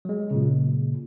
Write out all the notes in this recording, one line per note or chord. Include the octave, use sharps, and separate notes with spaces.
F#3 G#3
A#2 C#3